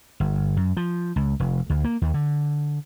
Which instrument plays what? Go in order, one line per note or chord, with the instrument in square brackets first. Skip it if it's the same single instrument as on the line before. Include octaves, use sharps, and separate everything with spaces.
[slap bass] G1
F#2
F3
C#2
F1
D2
A#3
D#2
D3